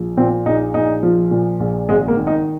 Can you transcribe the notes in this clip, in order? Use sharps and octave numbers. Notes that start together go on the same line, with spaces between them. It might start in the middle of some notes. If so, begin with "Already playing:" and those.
Already playing: A#1 F3
A#2 C4
A#1 D#4
A#1 D#4
F3
A#2
A#1
G#1 G#3
A#3
D#3
D#4